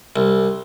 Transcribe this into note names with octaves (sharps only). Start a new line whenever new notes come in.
C2